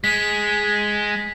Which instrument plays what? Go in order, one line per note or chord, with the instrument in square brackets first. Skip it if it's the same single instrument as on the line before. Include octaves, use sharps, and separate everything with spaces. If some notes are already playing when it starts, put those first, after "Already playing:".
[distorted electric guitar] G#3 [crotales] B6